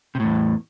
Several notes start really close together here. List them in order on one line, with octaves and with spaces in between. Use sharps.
C3 A2 E2